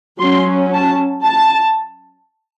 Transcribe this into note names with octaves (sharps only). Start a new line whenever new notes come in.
F#3 C#4 C6
A5
A5